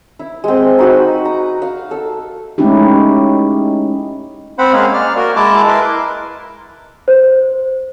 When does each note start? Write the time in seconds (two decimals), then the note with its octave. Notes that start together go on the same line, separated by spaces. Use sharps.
0.19 E4
0.44 G#3 C4
0.79 D#4 F#4 B4
1.25 A#5
1.62 F5
1.91 A4 E6
2.58 G#3 A3 C#4 D#4 E4 G4
4.58 C4 C5 F#5 B5
4.73 G#3 A#3 C#4 G#4 F5
4.94 D5 F6
5.16 A#3 F#4 A#4
5.36 G#3 E4 A5 D6
5.68 E4 A#4 B4 C6
7.08 C5